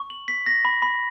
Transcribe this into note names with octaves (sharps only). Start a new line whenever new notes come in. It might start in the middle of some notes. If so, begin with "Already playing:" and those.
Already playing: C#6
F#7
B6
A#6
B5
B5